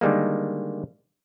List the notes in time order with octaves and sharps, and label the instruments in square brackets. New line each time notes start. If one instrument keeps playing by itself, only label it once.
[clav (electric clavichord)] D3 D#3 G3 G#3 A#3